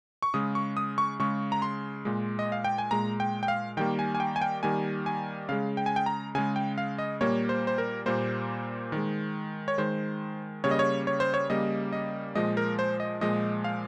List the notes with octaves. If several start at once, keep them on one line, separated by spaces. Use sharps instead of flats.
C#6
C#3 G#3 D#6
C#6
D#6
C#6
C#3 G#3 C#6
A#5
C6
A#2 G#3
D#5
F5
G5
G#5
A#2 G#3 A#5
G5
G5
F5
D#3 G3 A#3 G5
G#5
G#5
G5
G#5
G5
D#3 G3 A#3 G#5
G#5
C#3 G#3 F5
G5
G#5
G5
A#5
C#3 G#3 G#5
G5
F5
D#5
A#2 G3 A#3 C#5
C5
C5
A#4
A#2 G3 A#3 C5
D#3 G#3
C#5
D#3 G#3 C5
C#3 G3 A#3 C#5
D#5
C#5
C#5
C5
C#5
C#3 G3 A#3 D#5
D#5
A#2 F3 G#3 D#5
A#4
C5
D#5
A#2 F3 G#3 D#5
F5